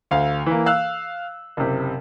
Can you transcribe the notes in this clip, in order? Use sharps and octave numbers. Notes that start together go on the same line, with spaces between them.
D2 F5
E3 A#3
F5 E6 F#6
F#1 C3